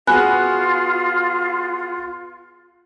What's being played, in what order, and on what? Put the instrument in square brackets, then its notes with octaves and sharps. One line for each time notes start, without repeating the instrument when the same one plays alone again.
[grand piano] B3 F#4 G#4 [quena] F4 [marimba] G#5 B5 F#6